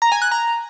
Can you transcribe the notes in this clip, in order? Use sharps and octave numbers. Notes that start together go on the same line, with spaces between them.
A#5
G#5
F#6
A#5